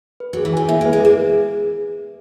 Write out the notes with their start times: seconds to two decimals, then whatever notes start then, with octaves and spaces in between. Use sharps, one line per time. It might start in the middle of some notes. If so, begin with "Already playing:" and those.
0.20 B4
0.33 F#3 G#4
0.45 E3
0.53 D#3 G#5
0.69 A#2 E5
0.81 G#3
0.85 B4
0.93 G#3
1.00 A#3 G#4